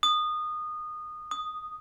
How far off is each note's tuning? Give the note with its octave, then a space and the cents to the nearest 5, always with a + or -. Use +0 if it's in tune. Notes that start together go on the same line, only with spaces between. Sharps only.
D#6 -20
D#6 -5